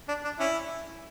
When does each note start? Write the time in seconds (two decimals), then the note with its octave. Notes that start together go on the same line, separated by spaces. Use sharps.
0.08 D4
0.25 D4
0.40 C#4 E4